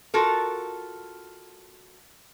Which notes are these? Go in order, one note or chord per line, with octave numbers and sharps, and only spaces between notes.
F4 F#4 A4 A#4